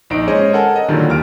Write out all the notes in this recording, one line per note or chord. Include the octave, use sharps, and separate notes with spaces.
A#1 D#4 D7
G#3 C#4 G#4 C5 C#5 D#5
A4 A#4 F#5 G#5 A5
D#5
A#2 D3 D#3 F#3 G3
D#2 F6 D7